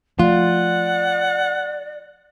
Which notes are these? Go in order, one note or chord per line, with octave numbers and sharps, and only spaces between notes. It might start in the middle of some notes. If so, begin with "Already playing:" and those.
F3 A3 F4 D5 F#5